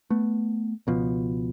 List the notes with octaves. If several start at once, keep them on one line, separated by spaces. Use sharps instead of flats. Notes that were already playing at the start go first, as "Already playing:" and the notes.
A3 B3
C#2 B2 F3